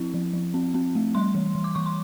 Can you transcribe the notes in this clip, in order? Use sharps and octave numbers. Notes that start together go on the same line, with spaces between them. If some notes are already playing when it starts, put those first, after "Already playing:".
Already playing: F3 C4 E4
F3
F3
C4
C4
A3
G3 C6
E3
E3
D6
E3 C#6
C6